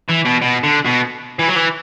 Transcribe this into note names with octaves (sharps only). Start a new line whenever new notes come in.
E3
B2
B2
D3
B2
E3
F#3
E3